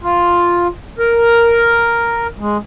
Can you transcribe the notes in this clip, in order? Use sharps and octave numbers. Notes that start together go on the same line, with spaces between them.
F4
A#4
G#3